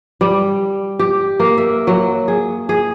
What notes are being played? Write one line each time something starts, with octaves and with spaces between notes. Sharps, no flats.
G3
G4
A#3
E5
F#3
G#4
G#4